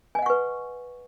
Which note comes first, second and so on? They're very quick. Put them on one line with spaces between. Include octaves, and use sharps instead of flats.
G#5 D#5 F#5 C#6 B4